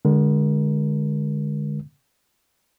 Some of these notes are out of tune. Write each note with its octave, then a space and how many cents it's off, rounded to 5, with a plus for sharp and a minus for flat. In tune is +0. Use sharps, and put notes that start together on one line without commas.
D3 +15 G#3 +0 A#4 +35